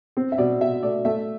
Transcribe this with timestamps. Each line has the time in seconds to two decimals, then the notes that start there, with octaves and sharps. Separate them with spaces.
0.17 C4
0.32 E5
0.38 B2 D5
0.60 B2 E5
0.83 A3 D5
1.05 A3 E5